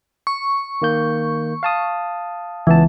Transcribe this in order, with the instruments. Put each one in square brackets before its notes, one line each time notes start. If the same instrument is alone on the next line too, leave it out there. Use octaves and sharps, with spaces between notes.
[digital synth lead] C#6
[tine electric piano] D#3 A#3 G6
F5 A5 D#6
[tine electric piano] C#2 B3 A5 [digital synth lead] E3